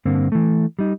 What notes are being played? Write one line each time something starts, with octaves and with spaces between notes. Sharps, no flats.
G2 D3 A#3 C4
E3 A3
G3 D#4